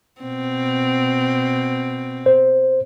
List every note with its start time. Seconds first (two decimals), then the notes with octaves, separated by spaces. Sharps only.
0.21 B2 C4
2.26 C5